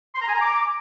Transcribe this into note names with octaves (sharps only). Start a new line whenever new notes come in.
C6
A#5
G#5
A#5
D6